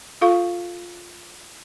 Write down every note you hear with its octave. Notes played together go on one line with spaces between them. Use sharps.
F4 A4 F5 C#6